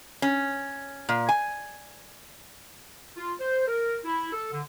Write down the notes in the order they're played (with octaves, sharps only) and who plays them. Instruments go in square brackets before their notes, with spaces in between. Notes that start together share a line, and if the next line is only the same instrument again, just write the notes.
[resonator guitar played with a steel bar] C#4
A#2
G#5
[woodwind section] F4
C5
A#4
E4
A4
D3